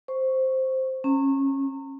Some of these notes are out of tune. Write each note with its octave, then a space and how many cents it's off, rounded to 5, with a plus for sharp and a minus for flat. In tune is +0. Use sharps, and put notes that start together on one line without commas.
C5 +0 C#6 +0
C#4 -25 A#5 -35